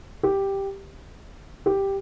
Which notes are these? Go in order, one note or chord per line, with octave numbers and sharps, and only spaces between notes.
G4
G4